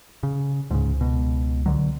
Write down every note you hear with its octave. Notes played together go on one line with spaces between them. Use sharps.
C#3
C#2 G#2 C#3
B2
D3 F#3